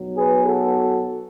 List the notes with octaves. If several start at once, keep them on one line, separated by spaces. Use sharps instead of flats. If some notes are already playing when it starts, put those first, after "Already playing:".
Already playing: B1 B2 F#3
G#4 B4
F#4 A4